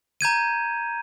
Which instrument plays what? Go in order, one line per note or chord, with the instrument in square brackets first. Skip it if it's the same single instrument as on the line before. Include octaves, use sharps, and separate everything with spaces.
[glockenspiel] A#5 G6 G#6 D#7